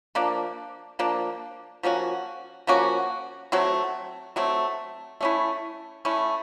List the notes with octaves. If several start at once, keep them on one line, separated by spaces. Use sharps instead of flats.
F3 A#3 D4
F3 A#3 D4
F3 A#3 C#4 F#4
F3 A#3 C#4 F#4
F#3 A3 C4
F#3 A3 C4
A3 C#4 E4
A3 C#4 E4